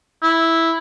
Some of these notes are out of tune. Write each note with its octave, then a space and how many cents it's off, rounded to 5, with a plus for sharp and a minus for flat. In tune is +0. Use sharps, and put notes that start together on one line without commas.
E4 -5